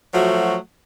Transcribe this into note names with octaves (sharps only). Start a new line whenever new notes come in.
F3 F#3 A3 F#4